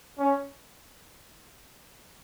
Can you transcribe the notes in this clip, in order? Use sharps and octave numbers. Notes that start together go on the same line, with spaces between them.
C#4